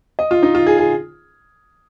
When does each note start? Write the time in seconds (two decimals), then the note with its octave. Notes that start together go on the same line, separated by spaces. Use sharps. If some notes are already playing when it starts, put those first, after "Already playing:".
0.19 D#5
0.31 F4
0.43 D#4
0.55 F4
0.67 G#4
0.78 G#4